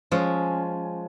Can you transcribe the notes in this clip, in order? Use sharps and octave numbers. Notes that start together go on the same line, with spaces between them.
F3 G#3 C#4